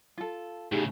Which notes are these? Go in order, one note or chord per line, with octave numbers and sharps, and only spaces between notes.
F4 A4
A2 C#3 D#4 G4 G#4